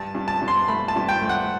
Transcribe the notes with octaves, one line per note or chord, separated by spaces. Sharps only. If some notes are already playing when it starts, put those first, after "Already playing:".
Already playing: G2 A5
G2
A5
G2
C6
A3 B5
A5
G2
G5
A3
F#5